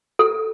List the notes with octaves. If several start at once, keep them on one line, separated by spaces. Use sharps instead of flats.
A4